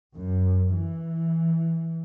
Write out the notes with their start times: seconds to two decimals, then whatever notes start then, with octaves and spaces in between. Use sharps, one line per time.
0.14 F#2
0.72 E3